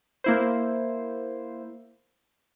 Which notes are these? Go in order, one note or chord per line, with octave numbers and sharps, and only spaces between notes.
A#3 E4 C5